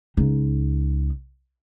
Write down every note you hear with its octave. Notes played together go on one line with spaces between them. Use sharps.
C#2 D#4